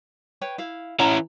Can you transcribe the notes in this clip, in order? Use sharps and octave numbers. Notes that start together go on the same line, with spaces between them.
B4 C#5 G5
E4 F5
E3 C#4 F#5 A5 A#5